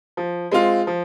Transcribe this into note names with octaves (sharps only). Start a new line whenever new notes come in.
F3
G#3 C4 F4
F3